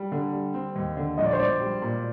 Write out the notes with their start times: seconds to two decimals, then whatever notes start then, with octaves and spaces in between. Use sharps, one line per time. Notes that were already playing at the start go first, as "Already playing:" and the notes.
Already playing: G3
0.12 D3
0.33 G3
0.54 C4
0.76 D#2
0.97 D3
1.18 A#1 D#5
1.25 D5
1.33 C5
1.39 A#1 D5
1.61 G3
1.82 A#2